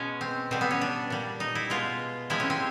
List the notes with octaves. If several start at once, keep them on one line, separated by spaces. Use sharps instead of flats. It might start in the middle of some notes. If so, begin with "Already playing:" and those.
Already playing: B2 G#3 C#4
C4
B2 G3 C4
B3
C#4
D4
A#2 G3
D#4
E4
B2 G#3 F4
C3 F3 G#3 E4
C#4
C4